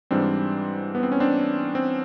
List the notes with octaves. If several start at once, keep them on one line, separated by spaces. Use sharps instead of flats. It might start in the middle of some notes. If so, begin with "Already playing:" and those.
G#2 E3 G3 C4 D4
B3
C4
C#4
C4 D4
C4